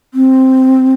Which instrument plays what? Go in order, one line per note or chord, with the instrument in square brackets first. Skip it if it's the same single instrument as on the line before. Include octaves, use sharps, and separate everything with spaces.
[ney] C4